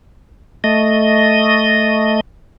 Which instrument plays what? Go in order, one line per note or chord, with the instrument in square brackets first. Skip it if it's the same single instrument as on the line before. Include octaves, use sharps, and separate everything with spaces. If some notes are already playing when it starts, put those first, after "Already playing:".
[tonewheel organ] A3 D#5